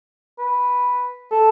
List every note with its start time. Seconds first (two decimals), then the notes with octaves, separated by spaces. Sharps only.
0.39 B4
1.31 A4